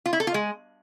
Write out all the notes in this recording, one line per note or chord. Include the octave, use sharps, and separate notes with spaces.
F4
E4
A4
F4
G#3